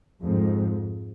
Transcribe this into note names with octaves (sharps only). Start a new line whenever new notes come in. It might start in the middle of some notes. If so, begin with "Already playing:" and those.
F2 G#2